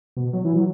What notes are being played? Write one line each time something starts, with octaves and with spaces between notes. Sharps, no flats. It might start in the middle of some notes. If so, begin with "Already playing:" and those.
B2
F#3
E3
F#3